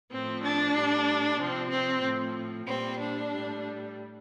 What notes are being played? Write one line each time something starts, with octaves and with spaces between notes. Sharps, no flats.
A2 F3 C4
D4
A2 G3
C3 F3 C4
C4
A2 F3
A#2 G3 C4
D4
A2 G3